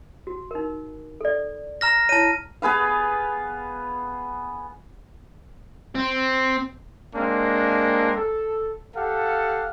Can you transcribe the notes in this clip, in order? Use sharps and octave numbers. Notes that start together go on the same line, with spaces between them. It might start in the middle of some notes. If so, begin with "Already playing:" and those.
F#4
D#4 A#4
A4 D5
A#5 F6 A#6
E4 C#5 A5 D#7
B3 G#4 B4 F5
C4
G#3 A#3 C4 D4
A4
G4 A4 F5 F#5